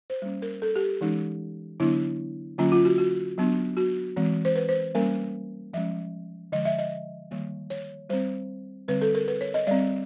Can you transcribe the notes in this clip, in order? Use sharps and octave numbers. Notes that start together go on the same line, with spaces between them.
C5
G3 A#3 C#4
A#4
A4
G4
E3 G#3 C#4 D#4
D3 F#3 B3 D4 E4
D3 F#3 A#3 C#4 F4
F4
F#4
F#4
F#3 B3 D4
F#4
E3 G#3 C4
C5
B4
C5
G3 A#3 C#4 A#4
F3 G#3 C#4 E5
D3 F3 G#3 D#5
E5
D#5
D#3 G3 A#3
C#5
G3 C4 C5
D3 G3 C4 B4
A4
A#4
B4
C#5
D#5
G3 C4 D5